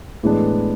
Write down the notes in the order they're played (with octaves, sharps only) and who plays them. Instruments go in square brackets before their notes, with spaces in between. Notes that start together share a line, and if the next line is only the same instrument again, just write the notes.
[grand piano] A2 E3 G#3 B3 D4